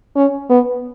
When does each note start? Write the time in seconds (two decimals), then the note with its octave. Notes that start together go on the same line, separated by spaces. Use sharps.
0.16 C#4
0.50 B3